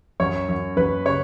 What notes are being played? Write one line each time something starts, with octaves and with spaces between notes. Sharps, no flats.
F#2 C#5
F#2
F#2 B4
C#3 C#5